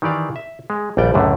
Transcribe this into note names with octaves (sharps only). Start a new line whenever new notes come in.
D#3 E3 G4 D5 F5
E5
G#3
A#1 D#2 G3 D5 G5
C#2 F#2 A2 D3 A3